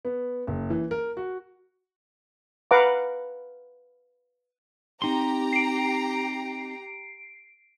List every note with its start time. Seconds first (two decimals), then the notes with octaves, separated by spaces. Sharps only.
0.05 B3
0.47 F#1
0.70 E3
0.91 A#4
1.17 F#4
2.71 B4 F5 F#5 A#5 D6
5.02 C4 D#4 G4 A#5 C6
5.53 C7 D7